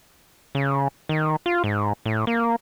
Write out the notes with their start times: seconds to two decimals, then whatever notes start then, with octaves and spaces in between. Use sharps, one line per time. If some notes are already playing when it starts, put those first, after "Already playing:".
0.55 C#3
1.09 D#3
1.46 F4
1.64 G#2
2.06 A2
2.27 A#3